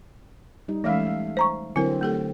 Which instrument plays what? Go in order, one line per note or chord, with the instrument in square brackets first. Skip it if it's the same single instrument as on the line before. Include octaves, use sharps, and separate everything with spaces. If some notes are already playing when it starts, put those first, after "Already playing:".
[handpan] G3 D#4
[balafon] E3 G#3 C#4 [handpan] A3 E5 F5
[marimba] C5 A#5 C#6
[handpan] D3 F#3 C4 [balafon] E4 A#4 [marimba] G#5
[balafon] A3 G4 A4